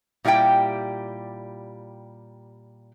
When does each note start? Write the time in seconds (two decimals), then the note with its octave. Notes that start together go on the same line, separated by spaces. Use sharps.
0.24 A#2 G3 E4 G4 G5